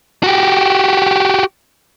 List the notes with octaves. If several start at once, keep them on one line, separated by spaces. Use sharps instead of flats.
F#4 G4